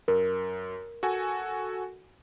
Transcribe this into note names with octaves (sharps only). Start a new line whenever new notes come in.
F#2 A#4
F#4 A4 G#5